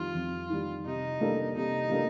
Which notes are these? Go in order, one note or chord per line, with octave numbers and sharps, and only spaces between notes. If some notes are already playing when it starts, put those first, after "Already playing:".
Already playing: F2 D#3 G3 F4
F2
D#3 G3
C3 D#4
G3 A#3 D4 A4
C3 D#4
G3 A#3 D4 A4